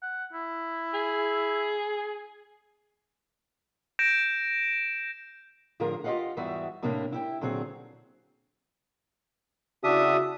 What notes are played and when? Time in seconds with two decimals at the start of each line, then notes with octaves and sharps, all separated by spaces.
0.02 F#5
0.33 E4
0.94 G#4
3.99 G6 A#6 D7 E7
5.80 A2 D3 F3 F4 G#4 A#4
6.04 F4 G4 A#4 D#5 F5 F#5
6.37 E2 G#2 E3 G3 F#4 E5
6.82 A2 C3 G3 A#3 D4
7.12 E4 G4 G5
7.41 A#2 D3 F#3 C4 G#4
9.84 C#3 D4 E4 F#4 E5 D#6